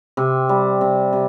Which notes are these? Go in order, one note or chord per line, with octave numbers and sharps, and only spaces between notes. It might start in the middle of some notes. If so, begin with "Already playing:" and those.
C3
G3
C3
C3